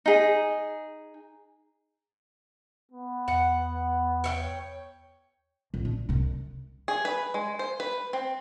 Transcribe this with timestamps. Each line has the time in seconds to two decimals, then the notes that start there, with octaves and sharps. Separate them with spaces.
0.06 D#4 G#4
2.92 B3
3.28 E2 F#5
4.24 C#5 E5 G5
5.74 A#1
5.85 D4
6.09 C2 C3
6.88 G#4
7.05 B4
7.34 G#3
7.59 C5
7.80 B4
8.13 C4